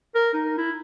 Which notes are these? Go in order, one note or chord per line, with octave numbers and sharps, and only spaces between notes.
A#4
D#4
E4